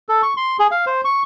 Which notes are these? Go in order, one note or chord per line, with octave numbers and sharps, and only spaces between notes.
A4
C#6
C6
G#4
F5
C5
C#6